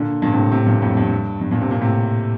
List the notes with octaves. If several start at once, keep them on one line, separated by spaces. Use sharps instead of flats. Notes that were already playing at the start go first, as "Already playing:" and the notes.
Already playing: A#2 D3
G2 A#2
A2 C3
A2 C3
G2 A#2
F2 A2
G2
G2
G2 A#2
C3
A#2
A2 C3